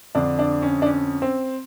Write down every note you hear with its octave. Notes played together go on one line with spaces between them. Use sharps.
F2 D3 D4
D4
C#4
D4
C#4
C4